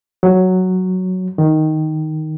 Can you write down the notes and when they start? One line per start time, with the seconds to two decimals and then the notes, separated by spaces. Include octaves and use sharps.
0.23 F#3
1.38 D#3